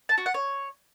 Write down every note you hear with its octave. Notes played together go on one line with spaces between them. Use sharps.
A5
F#4
F#5
C#5